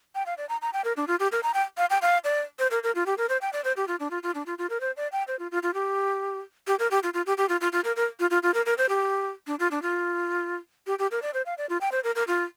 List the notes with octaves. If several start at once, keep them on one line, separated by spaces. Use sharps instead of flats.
G5
F5
D5
A#5
A#5
G5
A#4
D4
F4
G4
A#4
A#5
G5
F5
G5
F5
D5
C5
A#4
A#4
F4
G4
A#4
C5
G5
D5
C5
G4
F4
D4
F4
F4
D4
F4
F4
A#4
C5
D5
G5
C5
F4
F4
F4
G4
G4
A#4
G4
F4
F4
G4
G4
F4
F4
F4
A#4
A#4
F4
F4
F4
A#4
A#4
C5
G4
D4
F4
D4
F4
G4
G4
A#4
D5
C5
F5
D5
F4
G5
C5
A#4
A#4
F4